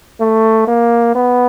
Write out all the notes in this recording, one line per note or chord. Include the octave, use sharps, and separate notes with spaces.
A3
A#3
B3